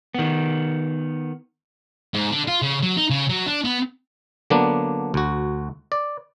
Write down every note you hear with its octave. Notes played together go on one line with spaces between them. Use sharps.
D#3 B3
G#2
D3
F4
C#3
F#3
D#4
C#3
F#3
D4
B3
D3 F#3 A#3 B3 D4
D2 F#4
D5